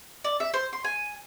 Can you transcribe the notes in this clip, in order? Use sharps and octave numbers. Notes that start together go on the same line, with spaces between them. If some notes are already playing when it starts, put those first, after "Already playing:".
D5
E5
C5
C6
G#5